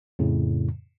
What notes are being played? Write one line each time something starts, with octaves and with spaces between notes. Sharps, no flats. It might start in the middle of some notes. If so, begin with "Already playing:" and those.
F2 A2 C#3